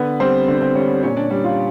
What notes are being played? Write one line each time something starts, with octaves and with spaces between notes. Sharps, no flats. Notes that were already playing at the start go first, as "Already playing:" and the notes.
Already playing: D3 B3 B4
G3 C4 C5
D3
C4 C5
G3 C#4 C#5
A#2 C#4 C#5
D4 D5
G3
F4 F5